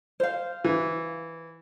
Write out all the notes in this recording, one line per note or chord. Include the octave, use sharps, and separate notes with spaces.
C5 F5
E3